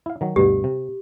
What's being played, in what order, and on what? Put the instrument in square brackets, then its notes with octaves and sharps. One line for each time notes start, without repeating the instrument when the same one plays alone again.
[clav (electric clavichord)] E4 F5
D#3 F#3
[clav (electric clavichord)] D2 G2 B2 [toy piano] G4
[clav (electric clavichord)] C3